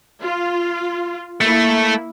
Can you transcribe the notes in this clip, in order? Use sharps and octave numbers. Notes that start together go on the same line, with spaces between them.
F4
A3 A#3 E4